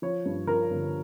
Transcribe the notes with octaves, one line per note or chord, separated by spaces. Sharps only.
F3 C#5
G2
F3 A#4
G1